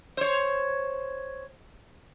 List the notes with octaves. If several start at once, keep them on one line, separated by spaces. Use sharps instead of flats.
C5 C#5